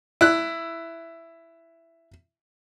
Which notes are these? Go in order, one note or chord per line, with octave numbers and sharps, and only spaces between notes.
E4 F#6